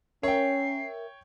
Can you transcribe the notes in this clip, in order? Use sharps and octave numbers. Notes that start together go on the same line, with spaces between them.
C#4 A#4 C#5 E5 G5 C7